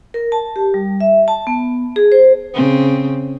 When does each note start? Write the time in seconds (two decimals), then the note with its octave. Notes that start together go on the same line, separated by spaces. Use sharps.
0.14 A#4
0.32 A5
0.56 G4
0.74 G3
1.01 E5
1.28 A5
1.47 B3
1.96 G#4
2.12 C5
2.54 C#3 C4